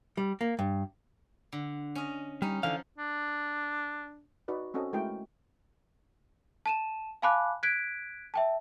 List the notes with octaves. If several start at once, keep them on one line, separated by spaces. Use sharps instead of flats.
G3
A#3
G2
D3
C#4 D#5
G3 C#4 D#4
D3 E3 F3 F5 F#5
D4
D#4 F#4 B4 D5
C4 C#4 F#4 A4 D#5
G#3 A3 E4 F#4 A#4 G5
A5 D#7 E7
F5 G#5 A5 B5 D6 F#6
F#6 G#6 B6 D7
E5 G5 A5